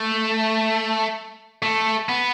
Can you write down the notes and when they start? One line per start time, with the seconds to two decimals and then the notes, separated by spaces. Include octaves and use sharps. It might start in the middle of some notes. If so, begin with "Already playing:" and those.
Already playing: A3
1.62 A3
2.09 B3